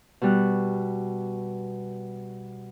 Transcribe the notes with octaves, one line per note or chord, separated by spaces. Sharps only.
B2 G3 F#6